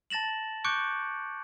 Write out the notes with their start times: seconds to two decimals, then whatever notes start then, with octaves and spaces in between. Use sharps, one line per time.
0.10 A5 A6 A#6 E7 F#7
0.64 C#6 D6 F#6 G6 C#7 D7